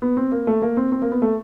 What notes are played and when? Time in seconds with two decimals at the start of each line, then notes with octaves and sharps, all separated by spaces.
0.02 B3
0.17 C4
0.31 A#3
0.47 A3
0.62 A#3
0.77 C4
0.92 C4
1.02 A#3
1.11 B3
1.22 A3